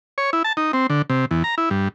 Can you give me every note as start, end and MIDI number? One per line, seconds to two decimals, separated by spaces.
0.18 0.30 73
0.33 0.43 64
0.44 0.53 81
0.57 0.72 63
0.73 0.87 60
0.90 1.02 50
1.10 1.25 48
1.31 1.43 40
1.44 1.55 82
1.58 1.69 64
1.70 1.88 43